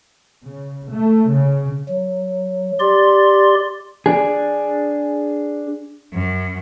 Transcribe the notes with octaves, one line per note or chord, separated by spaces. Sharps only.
C#3
A3
C#3
F#3
G4 D5 C6
D4 G#4
F#2